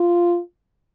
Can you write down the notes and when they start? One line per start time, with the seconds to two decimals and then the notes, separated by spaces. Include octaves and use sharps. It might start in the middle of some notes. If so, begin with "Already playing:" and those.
Already playing: F4